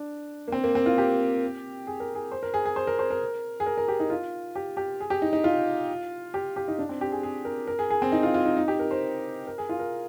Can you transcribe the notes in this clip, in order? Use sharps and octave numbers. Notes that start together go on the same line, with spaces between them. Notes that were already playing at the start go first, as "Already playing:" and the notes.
Already playing: D4
A#3
C4
A#3
C4
F4
G4
G#4
A#4
G#4
C5
A#4
G#4
G#4
C5
A#4
C5
A#4
G#4
A#4
A#4
G4
D#4
F4
G4
G4
G#4
G4
D#4
D#4
F4
G4
G4
D#4
D4
C4
G4
G#4
G#4
A#4
A#4
G#4
G#4
C4
D#4
F4
F4
D#4
D#4
G4
A#4
C5
A#4
G#4
F4
A#4